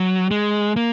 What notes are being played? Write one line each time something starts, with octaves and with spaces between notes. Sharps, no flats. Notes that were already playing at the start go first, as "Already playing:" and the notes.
Already playing: F#3
G#3
A#3